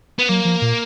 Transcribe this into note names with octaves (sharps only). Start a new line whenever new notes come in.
B3
F#3 A#3
F3
A#2